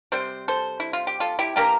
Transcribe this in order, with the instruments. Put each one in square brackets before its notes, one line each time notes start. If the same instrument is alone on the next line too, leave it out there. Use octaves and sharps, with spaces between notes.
[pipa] C3 G3 C4 C5
A4 C5
E4
F4
G4
F4 A4
E4 G4
E3 A#3 D4 G4 A#4